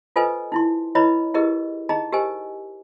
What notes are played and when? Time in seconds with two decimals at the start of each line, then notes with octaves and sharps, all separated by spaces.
0.16 F4 A4 B4 C5 D#5 G#5
0.52 D#4 E4 C6
0.95 E4 B4 C#5 D#5 A#5 B5
1.34 E4 G4 G#4 A#4 B4 D#5
1.89 D#4 G#4 D#5 A#5
2.12 G4 A#4 C5 D#5 G#5